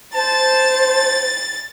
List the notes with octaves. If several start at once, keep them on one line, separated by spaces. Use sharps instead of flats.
C5 A5 A6